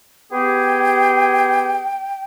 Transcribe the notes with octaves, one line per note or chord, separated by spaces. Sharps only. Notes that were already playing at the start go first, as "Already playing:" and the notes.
B3 G4 G#4 G5